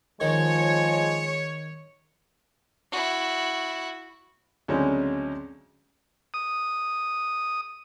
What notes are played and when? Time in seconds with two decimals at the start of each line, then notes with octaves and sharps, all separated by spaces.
0.21 D#3 F3 G#3 C#5
2.92 E4 F#4
4.68 D2 C#3 F#3 G#3 C4 C#4
6.34 D#6